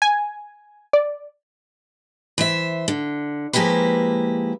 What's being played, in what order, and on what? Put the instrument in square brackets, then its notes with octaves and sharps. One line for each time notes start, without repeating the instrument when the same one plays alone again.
[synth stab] G#5
D5
[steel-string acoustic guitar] E3 C5 E5
D3
F3 G#3 A#3 E4 G4 B4